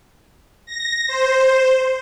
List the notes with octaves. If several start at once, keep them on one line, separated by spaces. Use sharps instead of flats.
A#6
C5